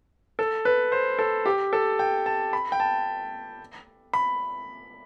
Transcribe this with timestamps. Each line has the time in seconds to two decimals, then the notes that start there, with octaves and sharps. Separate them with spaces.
0.39 A4
0.65 B4
0.92 C5
1.19 A4
1.46 G4
1.73 A4
1.99 G5
2.26 A5
2.53 B5
2.72 G5
2.80 A5
4.14 B5